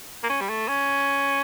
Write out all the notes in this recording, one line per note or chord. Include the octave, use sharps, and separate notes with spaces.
A#3
C#4
G3
A3
C#4